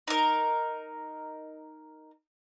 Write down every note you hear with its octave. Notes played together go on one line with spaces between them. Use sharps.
D#4 A#4